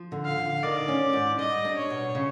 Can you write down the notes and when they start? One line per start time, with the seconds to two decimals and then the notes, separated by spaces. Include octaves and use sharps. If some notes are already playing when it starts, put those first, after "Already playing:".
Already playing: F3
0.12 D3
0.25 F5
0.38 D3
0.63 D#3 D5
0.88 C#4
1.13 G#2
1.39 G3 D#5
1.65 D4
1.77 C#5
1.90 B2
2.15 C#3